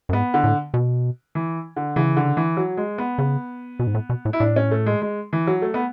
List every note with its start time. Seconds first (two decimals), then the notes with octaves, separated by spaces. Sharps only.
0.09 F#2
0.13 G#2 B3
0.34 D3
0.44 A2
0.74 B2
1.35 E3
1.76 D3
1.96 C#3 E3
2.17 D3
2.37 E3
2.57 F#3
2.77 G#3
2.98 B3
3.18 C#3
3.80 B2
3.87 G#2
3.94 A2
4.10 B2
4.25 A2
4.33 E4
4.40 A2 D4
4.56 C#4
4.71 A3
4.86 G#3
5.02 G#3
5.33 E3
5.47 F#3
5.62 A3
5.74 B3